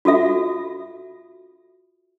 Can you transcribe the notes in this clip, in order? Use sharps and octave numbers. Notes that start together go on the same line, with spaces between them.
F4 F#4 A4 E5